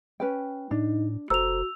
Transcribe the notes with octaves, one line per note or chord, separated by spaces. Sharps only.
C#4 B4 G5
A2 D4 D#4
F1 F#4 A4 C5 A#5 E6 F7